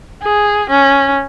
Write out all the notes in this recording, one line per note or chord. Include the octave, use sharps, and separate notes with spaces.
G#4
C#4